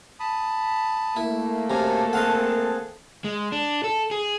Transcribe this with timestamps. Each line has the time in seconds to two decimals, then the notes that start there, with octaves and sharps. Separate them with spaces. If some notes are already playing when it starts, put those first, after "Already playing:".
0.20 A5 B5 D#6
1.17 A3 A#3 E4
1.70 F#2 C3 A4 G#5 A#5 F6
2.13 C4 G#4 D#5 F5 F#5
3.24 G#3
3.52 D4
3.84 A4
4.11 G#4